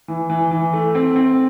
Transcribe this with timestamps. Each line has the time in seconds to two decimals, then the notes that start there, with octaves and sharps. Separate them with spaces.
0.08 E3
0.30 E3
0.51 E3
0.73 A3
0.95 C4
1.16 C4